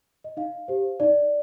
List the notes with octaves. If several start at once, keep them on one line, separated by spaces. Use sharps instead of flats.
D#5
D#4 F5
G4 C5
D#4 D5